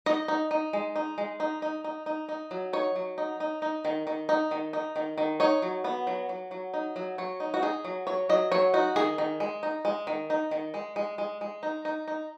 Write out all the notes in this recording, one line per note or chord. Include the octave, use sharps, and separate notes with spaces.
D#4 D#5
D#4
D#4
G#3
D#4
G#3
D#4
D#4
D#4
D#4
D#4
F#3
D#4 C#5
F#3
D#4
D#4
D#4
D#3
D#3
D#4
D#3
D#4
D#3
D#3
D#4 C#5
F#3
B3
F#3
F#3
F#3
D#4
F#3
F#3 C#5
D#4
F#4
D#4 G#4
F#3
F#3 C#5
F#3 D#5
F#3 C#5
D#4 F#4
D#3 G#4
D#3
G#3
D#4
G#3
D#3
D#4
D#3
G#3
G#3
G#3
G#3
D#4
D#4
D#4